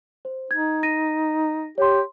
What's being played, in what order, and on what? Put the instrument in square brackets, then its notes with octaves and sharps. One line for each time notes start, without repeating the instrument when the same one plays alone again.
[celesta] C5
[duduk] D#4 [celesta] G#6
[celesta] A#6 D#7
[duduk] G4 [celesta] C#5 C6